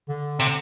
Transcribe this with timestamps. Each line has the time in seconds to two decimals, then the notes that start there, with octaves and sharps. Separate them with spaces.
0.09 D3
0.40 C3